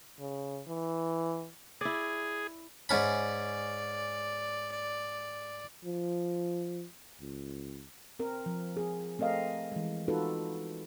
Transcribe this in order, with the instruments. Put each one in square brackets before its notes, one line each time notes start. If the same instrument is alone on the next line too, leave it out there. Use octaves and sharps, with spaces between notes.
[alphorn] C#3
E3
[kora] E4 D5 [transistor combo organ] G#4
[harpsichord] G#2 C#4 B5 [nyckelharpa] D5
[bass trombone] F3
C#2
[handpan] C4 A#4
F3
C4 G#4
A3 C4 A#4 D#5 F5
E3 G#3
C4 D#4 F4 F#4 A4 B4